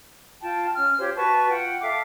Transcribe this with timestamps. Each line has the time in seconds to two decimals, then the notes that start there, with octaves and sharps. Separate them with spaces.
0.42 F4 G5 A5
0.75 C#4 F6
0.98 F4 G4 C5 C#5
1.16 F#4 B4 A5 C#6
1.50 F4 F#5 G5
1.81 A4 E5 F5 D6